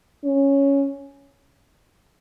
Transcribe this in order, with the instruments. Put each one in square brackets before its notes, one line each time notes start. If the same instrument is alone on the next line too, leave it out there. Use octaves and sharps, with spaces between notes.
[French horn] C#4